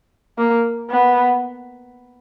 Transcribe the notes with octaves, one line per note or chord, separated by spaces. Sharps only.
A#3
B3